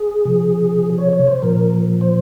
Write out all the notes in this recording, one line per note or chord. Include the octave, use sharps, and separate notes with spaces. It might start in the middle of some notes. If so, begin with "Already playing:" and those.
Already playing: G#4
C3 F3
C#5
C#5
C5
A#2 F3 A#4
C5